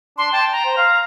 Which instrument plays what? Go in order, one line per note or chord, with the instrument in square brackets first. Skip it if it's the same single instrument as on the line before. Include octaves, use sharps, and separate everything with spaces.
[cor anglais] D4 [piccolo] C6
[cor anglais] G5 [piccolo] A5
[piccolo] A#5
[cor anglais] C5
F5